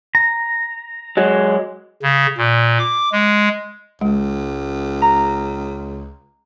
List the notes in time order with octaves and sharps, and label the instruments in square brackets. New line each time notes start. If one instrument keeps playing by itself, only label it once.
[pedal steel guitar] A#5
[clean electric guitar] F#3 G#3
[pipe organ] C#3
A#2
D6
G#3
[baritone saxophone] C#2 [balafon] G#3
[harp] A#5